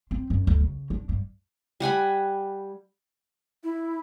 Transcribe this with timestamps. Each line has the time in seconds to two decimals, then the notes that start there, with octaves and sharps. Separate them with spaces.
0.11 C4
0.30 F#2
0.47 D2
0.60 C#3
0.90 D4
1.09 G2
1.80 G3 F#5 G#5 B5
3.64 E4